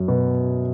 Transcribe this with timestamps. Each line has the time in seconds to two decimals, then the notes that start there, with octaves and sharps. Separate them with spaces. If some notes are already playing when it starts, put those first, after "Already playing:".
Already playing: F#2 F#3
0.08 B2